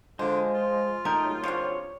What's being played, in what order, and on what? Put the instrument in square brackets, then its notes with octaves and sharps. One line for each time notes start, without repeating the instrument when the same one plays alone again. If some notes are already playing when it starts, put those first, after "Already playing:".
[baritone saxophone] D3 [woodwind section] F3 [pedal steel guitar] G#3 [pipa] C5
[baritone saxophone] F4
[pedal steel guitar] A3 D#4 G5 [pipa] A#4
[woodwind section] D#2 C#3 F#3
[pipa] F3 C4 D4 [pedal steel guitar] C#5